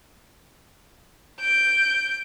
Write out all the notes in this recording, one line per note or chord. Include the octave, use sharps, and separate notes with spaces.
G6 D7